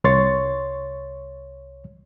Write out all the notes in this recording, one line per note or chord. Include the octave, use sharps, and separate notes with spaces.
C2 C#5 C6 C#6 A6